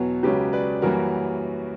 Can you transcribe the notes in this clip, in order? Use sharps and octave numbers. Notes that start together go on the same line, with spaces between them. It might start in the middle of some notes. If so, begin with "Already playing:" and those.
Already playing: E2 B2 F#3 B3 F#4
C#2 C#3 F#3 G4 B4
B4 D5
F#2 E3 G3 A#3 F#4 A#4